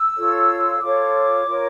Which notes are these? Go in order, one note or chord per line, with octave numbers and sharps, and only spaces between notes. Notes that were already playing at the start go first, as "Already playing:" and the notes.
Already playing: E6
F4 A4 C#5
F4 A4 C#5 D6
F4 A#4 C#5